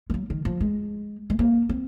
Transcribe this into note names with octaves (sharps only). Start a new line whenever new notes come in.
G#3
F#3
D#3
F3
G#3
G#3
A#3
C4